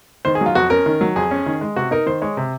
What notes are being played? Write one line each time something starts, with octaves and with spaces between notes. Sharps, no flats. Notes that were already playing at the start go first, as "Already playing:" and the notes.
D#3 C5
G#4
F#3 F4
F2 F#4
C#4 A#4
D#3
F#3
F2 G#4
C#4
D#3
G#3
C3 F#4
D#4 A#4
D#3 C5
G#3 C#5
C3